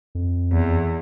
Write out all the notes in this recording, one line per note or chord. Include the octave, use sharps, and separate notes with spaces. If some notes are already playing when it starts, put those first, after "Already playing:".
F2
E2